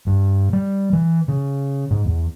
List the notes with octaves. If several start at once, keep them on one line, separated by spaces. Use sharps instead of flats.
G2
G3
E3
C#3
G#2
E2